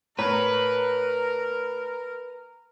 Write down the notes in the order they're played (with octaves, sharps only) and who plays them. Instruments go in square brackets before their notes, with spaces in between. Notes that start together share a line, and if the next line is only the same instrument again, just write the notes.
[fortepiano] A2 C#5 A#5 [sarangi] A#4 [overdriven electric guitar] B4